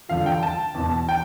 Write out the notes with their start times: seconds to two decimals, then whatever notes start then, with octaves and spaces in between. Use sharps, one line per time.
0.09 G2 D3 F3 F5
0.26 G5
0.43 A5
0.75 E2 B2
1.08 G5